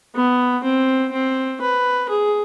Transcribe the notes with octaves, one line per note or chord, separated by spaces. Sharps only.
B3
C4
C4
B4
G#4